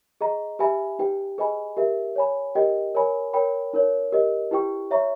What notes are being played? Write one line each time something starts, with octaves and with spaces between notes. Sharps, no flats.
G#4 D#5 A#5
G4 B4 E5 G#5 B5
D#4 G4 B4 G5
G#4 B4 D#5 G#5 B5
G4 A#4 E5
C#5 G#5 B5
G4 A#4 D#5 G5
A#4 C#5 G#5 B5
A#4 C#5 G5 B5
D#4 A#4 C#5
G4 A#4 D#5
E4 G4 B4 G5 C#6
C#5 E5 A#5 C#6